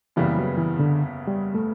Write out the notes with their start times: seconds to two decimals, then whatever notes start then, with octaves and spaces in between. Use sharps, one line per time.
0.16 F#1 E2 C#3 E3 G3 B3
0.38 F#3
0.58 E3
0.79 D3
1.27 G3
1.55 A3